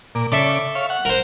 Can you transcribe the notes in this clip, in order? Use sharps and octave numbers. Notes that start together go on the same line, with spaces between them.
A#2 D6
C#3 A4 D5 E5 D6
C#5 F5
F#5
A#4 C5